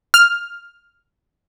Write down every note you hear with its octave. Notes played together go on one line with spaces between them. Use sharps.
F6